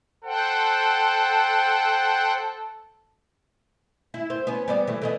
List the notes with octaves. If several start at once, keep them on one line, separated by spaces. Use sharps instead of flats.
A4 C5 F#5 G5
E4
C4
B3 C#4
G3 B3 D5
E3 A3
D3 B3 D#5